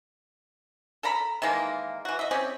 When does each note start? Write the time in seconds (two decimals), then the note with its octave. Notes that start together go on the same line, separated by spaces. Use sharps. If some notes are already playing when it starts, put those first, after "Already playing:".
1.03 A4 A#4 A#5 B5
1.42 D#3 E3 G#3 A#3
2.05 E3 F#4
2.19 D#5 E5
2.31 C4 C#4 G4 G#4